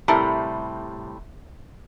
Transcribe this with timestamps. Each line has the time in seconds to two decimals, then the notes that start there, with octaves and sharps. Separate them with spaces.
0.08 A2 C3 G3 E4 A4 A#4